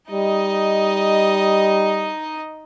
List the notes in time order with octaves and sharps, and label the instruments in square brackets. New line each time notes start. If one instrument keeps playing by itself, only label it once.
[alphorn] G3 [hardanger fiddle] D#4 D#5